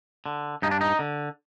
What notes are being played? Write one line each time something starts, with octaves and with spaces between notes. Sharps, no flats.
D3
G2 D#4
D4
D#4
D3